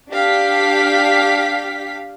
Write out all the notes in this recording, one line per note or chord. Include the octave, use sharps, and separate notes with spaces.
D4 G4 F5 B6